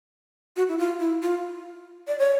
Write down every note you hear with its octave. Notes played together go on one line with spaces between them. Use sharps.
F#4
E4
F4
E4
F4
D5
C#5